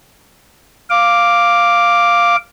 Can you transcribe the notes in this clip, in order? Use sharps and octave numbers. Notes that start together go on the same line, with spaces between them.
F5 D6